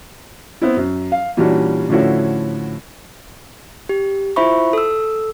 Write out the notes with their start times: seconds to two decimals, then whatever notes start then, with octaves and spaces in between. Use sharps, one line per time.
0.62 B3 C4 E4
0.77 F#2
1.12 F5
1.37 A#2 E3 G3 C#4 D4 F#4
1.89 A2 D3 F3 C#4 E4 F#4
3.89 G4
4.36 E4 F4 C5 E5 B5 C#6
4.73 A4 E6